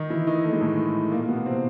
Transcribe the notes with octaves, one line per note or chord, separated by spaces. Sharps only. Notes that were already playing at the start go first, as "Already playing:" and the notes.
Already playing: D#3 D#4
E3 E4
D#3 D#4
A3
G#3
A2 A3
A#2 A#3
A#3
B2 B3
C3 C4